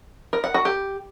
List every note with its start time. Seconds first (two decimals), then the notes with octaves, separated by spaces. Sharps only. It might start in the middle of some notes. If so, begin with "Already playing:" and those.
0.33 A#4
0.44 F#5
0.54 F#4
0.65 G4